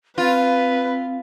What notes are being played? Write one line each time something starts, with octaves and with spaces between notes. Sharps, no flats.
C4 F4 B4